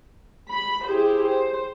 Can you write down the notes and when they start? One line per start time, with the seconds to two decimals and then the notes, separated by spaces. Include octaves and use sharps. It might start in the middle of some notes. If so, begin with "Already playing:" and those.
0.50 B5
0.87 E4 G4 G#4 C5
1.26 C5